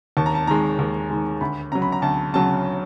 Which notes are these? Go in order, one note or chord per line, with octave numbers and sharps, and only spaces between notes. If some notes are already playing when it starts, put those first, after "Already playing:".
D#2 A5
A#5
A5
D#3 G#3 A#5
D#2
D#3 G#3
D2 B5
C#3 F#3 A#5
B5
A#5
D2 A5
C#3 F#3 A5